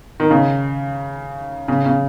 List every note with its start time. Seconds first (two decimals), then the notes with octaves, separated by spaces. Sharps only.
0.20 D#3
0.31 C#3
1.68 C#3
1.86 C#3